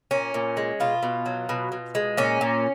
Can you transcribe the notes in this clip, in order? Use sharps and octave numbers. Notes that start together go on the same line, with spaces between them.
A#2 C#4
A#2
G#3
B2 F4
B2
F#3
B2
B2
G#3
A#2 C#4
A#2